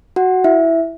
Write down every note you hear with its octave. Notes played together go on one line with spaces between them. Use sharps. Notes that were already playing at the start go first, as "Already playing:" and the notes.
F#4 F#5
E4 E5